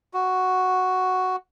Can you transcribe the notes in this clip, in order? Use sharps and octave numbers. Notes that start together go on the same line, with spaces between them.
F#4